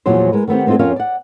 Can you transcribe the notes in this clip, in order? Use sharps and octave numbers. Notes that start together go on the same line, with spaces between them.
E2 A#2 F3 F#3 C5
G#3 A#4 B4
D#3 A3 B3 C4 G4
G#3 C4 D#4 F4 A4
F2 C#4 F4 A#4 C#5 F5
D5 F#5